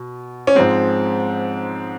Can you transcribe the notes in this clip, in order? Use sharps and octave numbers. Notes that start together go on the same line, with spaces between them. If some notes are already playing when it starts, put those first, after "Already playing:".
Already playing: B2
C#4
G#2 F3 G#3 C4